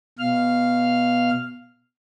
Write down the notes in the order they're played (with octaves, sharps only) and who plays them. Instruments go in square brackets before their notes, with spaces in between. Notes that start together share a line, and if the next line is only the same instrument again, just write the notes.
[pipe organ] B2 F5 F6